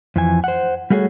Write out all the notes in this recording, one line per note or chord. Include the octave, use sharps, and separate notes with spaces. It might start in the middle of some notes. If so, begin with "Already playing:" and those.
F2 E3 G#5
C5 F#5
G3 A3 F#4 G#4 C5 C#5